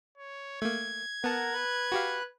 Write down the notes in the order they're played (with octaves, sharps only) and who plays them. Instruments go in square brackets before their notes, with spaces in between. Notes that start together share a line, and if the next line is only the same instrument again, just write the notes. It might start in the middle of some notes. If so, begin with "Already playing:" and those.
[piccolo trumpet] C#5
[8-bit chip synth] A3 A#3 [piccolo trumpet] G#6
[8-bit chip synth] B3 A5 [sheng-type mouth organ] A#4 F#5 A#5
[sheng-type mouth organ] B4 F#6
[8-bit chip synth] F#4 G4 F5